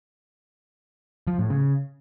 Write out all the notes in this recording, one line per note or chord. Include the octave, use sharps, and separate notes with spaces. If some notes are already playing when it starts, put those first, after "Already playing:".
F3
A2
C#3